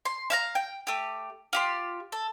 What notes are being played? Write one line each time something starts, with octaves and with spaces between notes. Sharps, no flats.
C6
E5 F5 A#5
G5
A3 G4
F4 G4 C6
A4